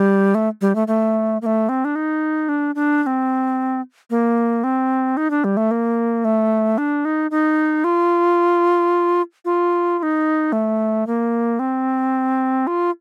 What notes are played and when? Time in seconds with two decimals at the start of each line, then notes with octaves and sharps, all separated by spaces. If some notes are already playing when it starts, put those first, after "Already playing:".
Already playing: G3
0.35 A3
0.61 G3
0.75 A3
0.88 A3
1.42 A#3
1.46 A3
1.69 C4
1.85 D4
1.95 D#4
2.49 D4
2.75 D4
3.03 D4
3.06 C4
4.10 A#3
4.64 C4
5.17 D#4
5.31 D4
5.44 G3
5.57 A3
5.71 A#3
6.25 A3
6.78 D4
7.05 D#4
7.31 D#4
7.84 F4
9.45 F4
9.99 F4
10.03 D#4
10.53 A3
11.07 A#3
11.59 C4
12.67 F4